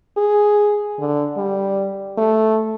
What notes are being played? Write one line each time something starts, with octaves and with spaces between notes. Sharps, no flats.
G#4
D3
G3
A3